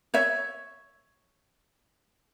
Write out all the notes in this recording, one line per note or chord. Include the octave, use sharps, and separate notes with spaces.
C#5 E5